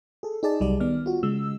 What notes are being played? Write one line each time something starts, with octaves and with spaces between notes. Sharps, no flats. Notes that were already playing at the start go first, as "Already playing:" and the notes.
G#4 A4
D#4 G#4 D5 A5
C2 F#3 G3 F#4 D5
D#3 B3 D5 F6
F4 F#4
C#3 G#3 E6